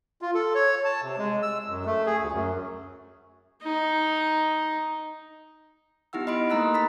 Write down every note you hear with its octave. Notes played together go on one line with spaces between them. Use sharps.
F4
A4
C#5
A5
C3
G#3
E6
F#2
A3
G#4
D2
F#2
D#4
B3 D#4 E4 G4 F#5 E6
D#5 B5 C6 D7
A3 A#3 D#4 A#5 E6 F#6
A#5 B5 A6 B6